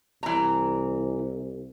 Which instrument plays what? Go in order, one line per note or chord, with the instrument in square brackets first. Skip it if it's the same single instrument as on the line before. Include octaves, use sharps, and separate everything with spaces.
[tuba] C2 [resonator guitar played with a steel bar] E3 A#5